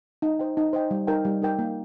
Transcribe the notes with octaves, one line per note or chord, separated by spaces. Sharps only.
D#4
C5 D#5 G5
D#4
C5 D#5 G5
G3
D#4 A#4 G5
G3
D#4 A#4 G5
A#3